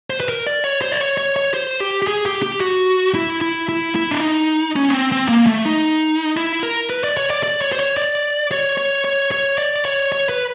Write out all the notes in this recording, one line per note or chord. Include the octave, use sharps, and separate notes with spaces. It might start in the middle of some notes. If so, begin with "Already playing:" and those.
C5
B4
A#4
D5
C#5
C5
D5
C#5
C#5
C#5
C5
G4
G4
G#4
G4
G4
F#4
E4
E4
E4
E4
D4
D#4
C#4
B3
C4
C4
A#3
A3
D#4
E4
A#4
B4
D5
C#5
D5
D5
C#5
C5
C#5
D5
C#5
C#5
C#5
C#5
D5
C#5
C#5
B4